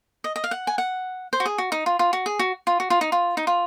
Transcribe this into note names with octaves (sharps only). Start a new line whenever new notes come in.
D#5
D#5
F5
F#5
G#5
F#5
C5
F#4
G#4
F#4
D#4
F4
F4
F#4
G#4
F#4
F4
F#4
F4
D#4
F4
D#4
F4